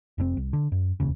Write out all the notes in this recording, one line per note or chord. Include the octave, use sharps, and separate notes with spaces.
F1 C3 C4
C2
D3
F#2
E1 D#2 C#3